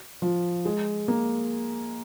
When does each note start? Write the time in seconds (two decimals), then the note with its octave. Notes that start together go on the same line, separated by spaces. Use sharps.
0.22 F3
0.65 G#3
1.08 A#3